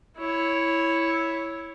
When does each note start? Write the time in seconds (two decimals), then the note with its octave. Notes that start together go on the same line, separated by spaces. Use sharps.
0.18 E4 C#5